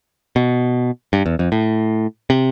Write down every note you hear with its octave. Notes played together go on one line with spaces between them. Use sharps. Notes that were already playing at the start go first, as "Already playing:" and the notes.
B2
G2
E2
F2
A2
C3